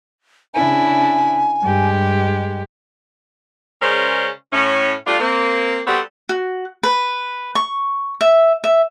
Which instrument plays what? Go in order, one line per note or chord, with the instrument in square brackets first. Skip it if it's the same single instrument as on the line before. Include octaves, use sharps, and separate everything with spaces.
[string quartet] C#3 D4 E4 [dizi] G#5
[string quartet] G2 G#3 G4
[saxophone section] C#3 G#3 C#4 A#4 C5 D5
A2 C#4
G3 A3 D4 F4
A#3 C4
G3 B3 C4 F#4 G4 A4
[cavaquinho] F#4
B4
C#6
E5
E5